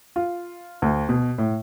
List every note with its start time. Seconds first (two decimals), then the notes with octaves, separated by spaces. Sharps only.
0.16 F4
0.82 D2
1.09 B2
1.38 A2